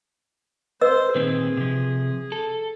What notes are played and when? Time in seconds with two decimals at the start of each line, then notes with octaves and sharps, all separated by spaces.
0.81 B4 C5 D#5 E6
1.15 A#2 D#3 C4 G#4
1.57 C3 F3
2.32 A4